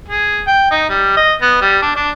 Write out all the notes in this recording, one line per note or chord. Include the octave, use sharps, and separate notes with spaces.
G#4
G5
D#4
G3
D#5
B3
G3
D4
D4